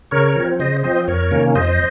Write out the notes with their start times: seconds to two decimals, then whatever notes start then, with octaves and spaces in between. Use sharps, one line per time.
0.11 C#3 A#4 C#5
0.36 F3 C4
0.59 C#3 C5 D#5
0.83 F3 C4 C5 D#5
1.07 F2 A#4 C#5
1.31 C3 D#3 A#3 C#4
1.55 F2 C5 D#5